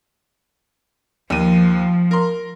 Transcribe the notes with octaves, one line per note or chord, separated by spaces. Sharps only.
D#2 F3 D#7
A#4 C6